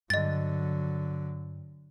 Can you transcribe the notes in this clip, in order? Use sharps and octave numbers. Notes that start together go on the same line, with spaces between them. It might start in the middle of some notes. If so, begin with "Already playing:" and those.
G2 D3 F#3 D#5 A6